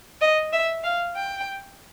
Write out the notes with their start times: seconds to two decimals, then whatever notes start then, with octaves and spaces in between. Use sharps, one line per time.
0.21 D#5
0.53 E5
0.84 F5
1.16 G5